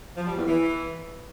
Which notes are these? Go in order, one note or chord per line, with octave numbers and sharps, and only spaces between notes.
F3
G3
E2
E3